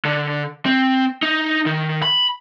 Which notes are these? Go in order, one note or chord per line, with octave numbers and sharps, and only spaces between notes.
D3
C4
D#4
D#3
B5